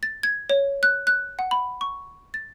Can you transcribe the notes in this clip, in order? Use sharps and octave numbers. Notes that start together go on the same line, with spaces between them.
A6
G#6
C#5
F#6
F#6
F#5
B5
C#6
A6